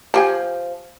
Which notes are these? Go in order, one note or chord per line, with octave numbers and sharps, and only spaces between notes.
F3 G4 G#5